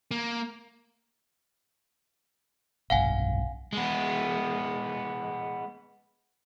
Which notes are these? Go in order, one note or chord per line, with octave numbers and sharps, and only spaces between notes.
A#3
F1 B1 G2 F5 F#5 G#5
G#3 B3